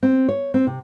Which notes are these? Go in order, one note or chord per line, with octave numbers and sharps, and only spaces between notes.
C4
C#5
C4
C3